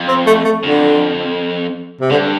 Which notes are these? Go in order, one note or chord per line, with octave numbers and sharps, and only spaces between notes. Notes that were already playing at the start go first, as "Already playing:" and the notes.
Already playing: F2
C4
A3
A3
F2 D3
C3
G2 D3